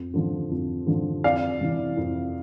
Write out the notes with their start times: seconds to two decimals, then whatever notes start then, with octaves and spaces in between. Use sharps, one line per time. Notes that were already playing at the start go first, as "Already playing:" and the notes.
Already playing: F2
0.14 D3 F3
0.51 F2
0.87 D3 F3
1.24 F2 D5 F5
1.61 C3 E3
1.97 F2